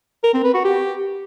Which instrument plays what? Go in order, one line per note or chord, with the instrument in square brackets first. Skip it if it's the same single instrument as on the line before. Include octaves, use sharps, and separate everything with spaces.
[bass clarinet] A#4
C4
B4
F#4
G4